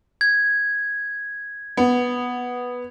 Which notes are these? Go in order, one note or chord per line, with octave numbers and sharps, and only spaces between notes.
G#6
B3